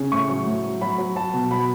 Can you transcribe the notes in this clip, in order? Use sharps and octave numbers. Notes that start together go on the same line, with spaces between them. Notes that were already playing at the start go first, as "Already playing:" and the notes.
Already playing: C#3
A2 C#6
F#3
A2
F#3
F#3 B5
F#3
F#3 A5
B2
F#3 B5